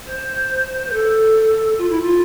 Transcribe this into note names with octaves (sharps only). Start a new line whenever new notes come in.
C5
B4
A4
F4
E4
F4